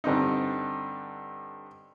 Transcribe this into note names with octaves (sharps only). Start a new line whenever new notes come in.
G2 D3 C4 D#4